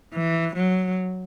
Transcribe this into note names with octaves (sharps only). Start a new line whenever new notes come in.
E3
F#3